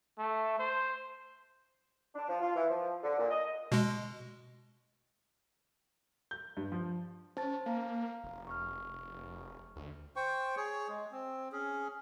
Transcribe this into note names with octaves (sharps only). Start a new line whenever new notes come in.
A3
C5
D4
F3
F4
E3
F3
D3
A#2
D#5
B2 G#3
G6
G2
F3
C#4 C5 A5 A6
A#3 F5 A#5
F1
C#6 F6
D2
C5 G5 C#6
G#4 C#5
G#3
C4
C#4 G#4